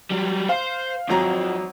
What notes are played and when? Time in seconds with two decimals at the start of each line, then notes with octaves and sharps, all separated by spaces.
0.10 F#3 G3
0.49 C5 F5
1.09 G#1 F2 F#3 A#5